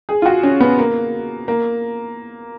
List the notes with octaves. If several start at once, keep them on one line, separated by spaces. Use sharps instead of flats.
G#4
F4
F#4
C#4
B3
A#3
A#3